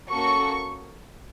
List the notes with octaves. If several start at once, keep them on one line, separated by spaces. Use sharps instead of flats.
A#3 C#4 F#4 A4 C#6